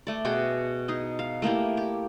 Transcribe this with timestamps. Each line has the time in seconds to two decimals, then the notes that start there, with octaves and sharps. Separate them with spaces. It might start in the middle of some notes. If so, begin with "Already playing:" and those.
0.07 A3 D5
0.25 B2 F#4 G#4 G5
0.88 D#4 G#4
1.19 F5
1.42 A3 A#3 E4 G4
1.77 G4